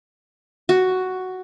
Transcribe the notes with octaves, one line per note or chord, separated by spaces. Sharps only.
F#4